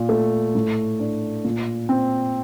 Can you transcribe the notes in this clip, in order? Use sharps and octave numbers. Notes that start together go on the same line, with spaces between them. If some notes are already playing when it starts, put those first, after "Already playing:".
Already playing: A#2
A3
A2
D4
A#2
C4